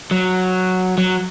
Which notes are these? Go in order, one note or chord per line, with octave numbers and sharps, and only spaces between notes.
F#3
F#3